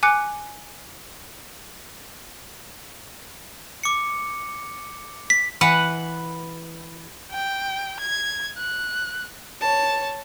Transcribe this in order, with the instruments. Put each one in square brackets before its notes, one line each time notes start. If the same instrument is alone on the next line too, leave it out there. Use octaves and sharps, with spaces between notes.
[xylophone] G#5 D6 F#6 C#7
[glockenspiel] D6 C#7
[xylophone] B6
[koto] E3 B4 F#5
[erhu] G5
G#6
F#6
[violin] C#5 A5